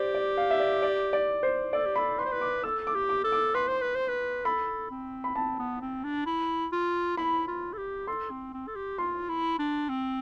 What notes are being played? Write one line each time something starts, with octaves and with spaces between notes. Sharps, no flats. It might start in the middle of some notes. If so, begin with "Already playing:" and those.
Already playing: G4 C5 D5
D5
F5
E5
D5
D5
D5
C5
A4 D5
G4
A4 B5
B4 C6
C5
B4
D6
A4 E6
D6
G4
D6
A4
D6
B4 C6
C5
B4
C5
B4
A4 B5
C4
B5
C4 A5
B3
C4
D4
E4
F4
E4 B5
F4
A4
G4
A4 C6
C4
C4
A4
G4
F4 C6
E4
D4
C4